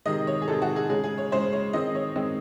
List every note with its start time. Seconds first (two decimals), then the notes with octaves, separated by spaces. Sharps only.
0.05 C3 D#3 G#3 D#5
0.27 C#5
0.42 G#4
0.48 C3 D#3 G#3 A4
0.62 F#4
0.76 G#4
0.89 C#3 G#3 C#4 G#4
1.04 G#4
1.18 C#5
1.31 C#3 G#3 C#4 C5
1.53 C#5
1.73 D#3 G#3 C4 D#4 D#5
1.95 C#5
2.16 D#3 G#3 C4 D#4